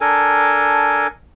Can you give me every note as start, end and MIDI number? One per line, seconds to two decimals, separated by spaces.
0.01 1.07 62
0.01 1.07 69
0.01 1.07 70
0.01 1.07 80